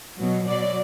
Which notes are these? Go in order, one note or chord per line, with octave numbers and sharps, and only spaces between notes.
B2 F#3
B2 F#3 D5